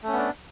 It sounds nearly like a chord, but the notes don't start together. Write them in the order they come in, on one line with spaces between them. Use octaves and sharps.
A3 C#4 B3 D4